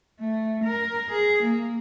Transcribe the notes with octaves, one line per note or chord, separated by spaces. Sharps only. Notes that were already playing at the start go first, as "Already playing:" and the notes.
A3
A#4
G#4
A#3